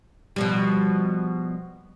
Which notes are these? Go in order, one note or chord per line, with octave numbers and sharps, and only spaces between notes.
B2 F3 G3